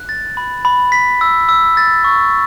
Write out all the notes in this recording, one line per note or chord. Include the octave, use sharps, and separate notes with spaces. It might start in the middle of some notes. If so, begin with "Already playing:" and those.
Already playing: F#6
A6
B5
B5
B6
E6
E6
A6
C#6